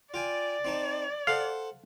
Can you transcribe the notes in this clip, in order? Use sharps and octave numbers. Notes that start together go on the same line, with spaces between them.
F4 D5 G5 G#5
C4 D#4 A5
A4 C5 F5 F#5